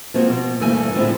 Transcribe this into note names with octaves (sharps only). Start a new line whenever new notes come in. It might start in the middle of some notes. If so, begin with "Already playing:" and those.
F3 G#3 A#3 C4 F#4
B2
D2 G2 E3 A3 A#3 G#5
A2 D3 F3 G#3 C4 E4